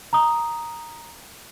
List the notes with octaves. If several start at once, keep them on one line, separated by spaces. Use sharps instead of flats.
A#5 D#6